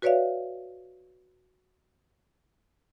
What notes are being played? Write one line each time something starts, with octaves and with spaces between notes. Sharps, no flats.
F#4 B4 C#5 D5 E5 F5